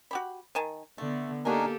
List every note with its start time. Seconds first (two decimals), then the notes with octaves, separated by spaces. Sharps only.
0.11 F#4 G4 B5
0.55 D#3 G#5 A5
0.98 D3 A3 B3
1.45 A#3 D4 D#4 F#4 G4 A4 A#4 G#5